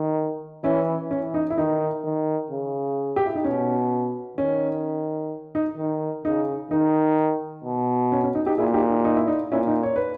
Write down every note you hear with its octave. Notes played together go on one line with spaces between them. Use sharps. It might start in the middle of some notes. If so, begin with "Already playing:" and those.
Already playing: D#3
E3 C#4 E4
E3 C#4
D#4
E4
D#3 D#4
D#3
C#3
G4
E4
D#4
B2 C#4
D#3 C#4
D#4
D#3
C#3 D#4
D#3 D#4
B2
C#4
C#4
D#4
D#4 G4
A#2 E4 G#4
D#4 G4
D#4
D#4
E4
D#4
A#2 C#4 E4
D#4
C#5
B4